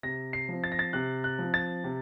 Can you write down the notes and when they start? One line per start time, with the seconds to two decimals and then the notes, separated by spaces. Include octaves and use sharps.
0.03 C3 A#6
0.33 C7
0.48 F3 C4
0.64 A6
0.72 A#6
0.79 A6
0.93 C3 F#6
1.24 F#6
1.39 F3 C4
1.54 A6
1.84 C3